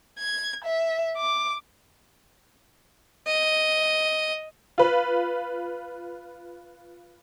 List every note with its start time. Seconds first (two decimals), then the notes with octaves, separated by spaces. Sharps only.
0.18 G#6
0.65 E5
1.17 D6
3.27 D#5
4.78 F4 B4